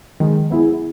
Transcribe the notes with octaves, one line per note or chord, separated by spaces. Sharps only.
D#3 G#3
B3 E4 G#4